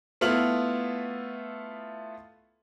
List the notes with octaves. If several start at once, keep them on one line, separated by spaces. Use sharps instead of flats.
A3 B3 E4 F4 F6 F#7